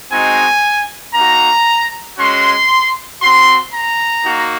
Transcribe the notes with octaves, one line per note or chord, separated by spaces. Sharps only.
G#3 C4 D#4 F#4 G#5
A#3 D#4 F#4 A#5
G#3 C#4 F#4 C6
C4 F#4 C6
A#5
A#3 D#4 F#4